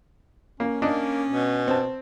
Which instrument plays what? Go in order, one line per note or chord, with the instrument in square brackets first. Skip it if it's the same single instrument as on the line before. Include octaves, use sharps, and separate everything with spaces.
[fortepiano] A#3 [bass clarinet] C#4
[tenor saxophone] A#3 [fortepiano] D4 D#4
[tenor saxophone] B2
[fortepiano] C4 A5